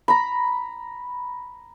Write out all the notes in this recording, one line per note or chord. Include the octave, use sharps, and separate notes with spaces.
A#5 B5